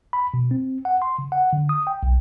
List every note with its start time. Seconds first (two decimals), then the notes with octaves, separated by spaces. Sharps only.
0.13 B5
0.34 B2
0.51 C4
0.85 F#5
1.02 C6
1.19 C#3
1.32 F#5
1.53 D3
1.69 D#6
1.87 G5
2.03 B1